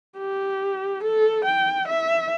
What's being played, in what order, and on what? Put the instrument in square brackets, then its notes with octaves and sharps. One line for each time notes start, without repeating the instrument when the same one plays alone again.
[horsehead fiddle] G4
A4
G5
E5